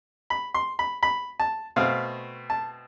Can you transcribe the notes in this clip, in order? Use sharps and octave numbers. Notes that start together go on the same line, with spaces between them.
B5
C6
B5
B5
A5
B2 A3 C4 F5
A5